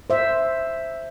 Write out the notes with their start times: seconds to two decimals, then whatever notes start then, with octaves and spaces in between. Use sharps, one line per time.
0.10 C5 E5